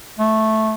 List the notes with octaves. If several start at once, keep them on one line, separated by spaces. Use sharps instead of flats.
A3